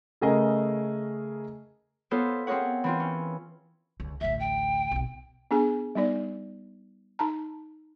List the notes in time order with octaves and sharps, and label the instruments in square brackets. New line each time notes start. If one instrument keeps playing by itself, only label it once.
[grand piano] C#3 A3 G#4 A#4 D#5
[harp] B3 F4 A4 C5 C#5
C4 F4 G#4 A#4 C#5 F#5
E3 C4 F4
C#4
[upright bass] C#2 D3
[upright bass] A1 D2 [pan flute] E5
[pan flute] G5
[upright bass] B1 C3
[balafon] B3 D4 G#4 G#5
G3 B3 D#4 D5
D#4 A5 A#5